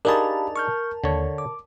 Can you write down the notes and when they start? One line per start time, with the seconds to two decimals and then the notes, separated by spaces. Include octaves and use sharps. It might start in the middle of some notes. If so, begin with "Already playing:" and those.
0.05 D4 D#4 G4 G#4 A#4 F5 A5 B5
0.56 C#6 F6 G6
1.04 D#2 D3 C#5
1.38 D6